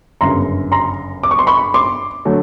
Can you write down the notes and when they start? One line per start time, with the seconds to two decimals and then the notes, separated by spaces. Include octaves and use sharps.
0.21 G1 F#2 C#3 A#5 C6
0.72 A#5 C6
1.23 D6
1.31 C#6
1.39 C6
1.47 B5 C#6
1.74 C6 D6
2.25 D3 F#3 A3